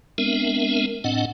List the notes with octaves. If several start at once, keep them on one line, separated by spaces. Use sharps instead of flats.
G#3 B3 C4 D4 A#4 E5
A2 C4 D4 D#5 F#5